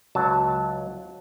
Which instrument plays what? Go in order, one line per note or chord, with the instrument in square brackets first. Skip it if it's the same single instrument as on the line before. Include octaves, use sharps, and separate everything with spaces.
[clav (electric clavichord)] C#2 F#3 A5